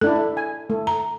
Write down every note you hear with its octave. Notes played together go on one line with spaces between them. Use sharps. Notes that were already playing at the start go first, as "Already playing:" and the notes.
A3 D4 E4 A4
G#5
A3
A#5